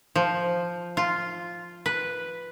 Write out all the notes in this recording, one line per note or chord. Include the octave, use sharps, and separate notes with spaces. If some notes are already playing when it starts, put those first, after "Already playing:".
F3
F4
B4